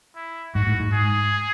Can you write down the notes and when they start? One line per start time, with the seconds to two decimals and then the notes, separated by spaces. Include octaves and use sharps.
0.16 E4
0.55 G#2 F#4
0.67 A2
0.80 G#2
0.93 G#4